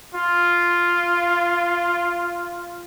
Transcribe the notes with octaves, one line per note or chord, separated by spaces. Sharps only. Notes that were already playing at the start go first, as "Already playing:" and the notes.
F4